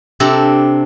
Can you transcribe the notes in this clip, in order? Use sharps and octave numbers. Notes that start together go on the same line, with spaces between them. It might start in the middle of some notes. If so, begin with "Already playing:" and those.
C3 D4 G4 A4 A#5